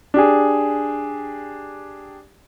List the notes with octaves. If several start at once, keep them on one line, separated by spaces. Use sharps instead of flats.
D4 G4 G#4